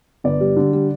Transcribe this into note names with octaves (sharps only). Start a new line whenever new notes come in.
G1 D5
G3
D3
G3